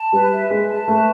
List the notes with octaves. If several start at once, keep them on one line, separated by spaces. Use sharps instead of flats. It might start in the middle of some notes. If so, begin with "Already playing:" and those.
Already playing: A5
G3 B4
E5
G#3 B4
A5
A3 B4